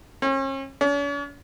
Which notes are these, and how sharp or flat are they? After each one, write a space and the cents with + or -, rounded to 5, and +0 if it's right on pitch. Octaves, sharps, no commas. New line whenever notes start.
C#4 -40
C#4 +45